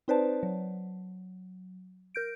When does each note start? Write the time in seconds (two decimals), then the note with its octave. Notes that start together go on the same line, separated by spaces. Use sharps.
0.08 C4 D#4 B4 C5 D5 A5
0.43 F#3
2.15 A#4 G6 D7